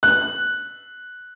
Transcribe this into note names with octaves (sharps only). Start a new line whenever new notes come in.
F#6